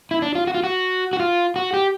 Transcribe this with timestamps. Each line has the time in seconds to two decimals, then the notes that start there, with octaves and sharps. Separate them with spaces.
0.11 E4
0.22 D4
0.35 F4
0.47 F#4
0.55 F4
0.64 F#4
1.13 F#4
1.20 F4
1.56 F#4
1.74 G4